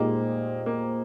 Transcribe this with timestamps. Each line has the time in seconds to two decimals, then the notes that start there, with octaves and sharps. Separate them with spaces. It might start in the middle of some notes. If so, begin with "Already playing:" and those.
Already playing: A#2 G#3 A#3 D#4 G4 C5
0.66 A#3